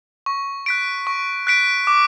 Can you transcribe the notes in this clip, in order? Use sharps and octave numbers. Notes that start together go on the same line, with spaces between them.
C#6
F#6 B6 D7
C#6
F#6 B6 D7
D6